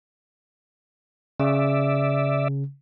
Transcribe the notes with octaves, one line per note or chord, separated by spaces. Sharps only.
C#3 D5 E5